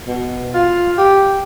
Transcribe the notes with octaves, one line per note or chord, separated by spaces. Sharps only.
B2
F4
G4